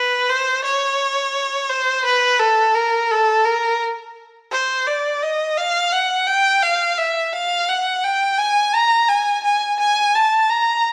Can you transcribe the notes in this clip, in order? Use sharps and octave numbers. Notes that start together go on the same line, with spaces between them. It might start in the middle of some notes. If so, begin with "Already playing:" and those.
Already playing: B4
C5
C#5
C5
B4
A4
A#4
A4
A#4
C5
D5
D#5
F5
F#5
G5
F5
E5
F5
F#5
G5
G#5
A#5
G#5
G#5
G#5
A5
A#5